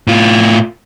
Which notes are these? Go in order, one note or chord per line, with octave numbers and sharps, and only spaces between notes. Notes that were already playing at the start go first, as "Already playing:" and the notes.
A2 F4